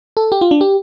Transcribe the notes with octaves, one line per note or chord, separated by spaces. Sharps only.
A4
G4
F4
D4
G4